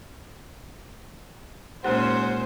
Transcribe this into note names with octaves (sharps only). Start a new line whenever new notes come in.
A#2 G#3 C#4 D#4 G4 C5 F#5